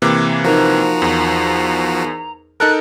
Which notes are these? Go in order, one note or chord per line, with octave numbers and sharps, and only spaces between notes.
C3 E3 A#3 D6
F3 D#4 F#4 A#4 C5 A#5
E2
D#4 A4 A#4 F#6